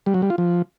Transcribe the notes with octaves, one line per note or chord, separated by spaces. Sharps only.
G3
F#3
G3
F4
F3